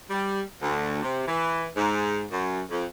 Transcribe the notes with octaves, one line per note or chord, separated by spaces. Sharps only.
G3
D2
C3
E3
G#2
F#2
F2